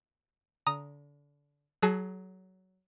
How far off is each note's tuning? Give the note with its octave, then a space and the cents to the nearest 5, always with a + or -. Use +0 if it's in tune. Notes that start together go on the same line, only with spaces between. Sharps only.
D3 -25 A#5 +0 D#6 +0
F#3 +15 G#4 +35 A5 +0